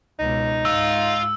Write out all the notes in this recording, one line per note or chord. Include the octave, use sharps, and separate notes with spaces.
C#2 B2 D#4
G#2 F4 E6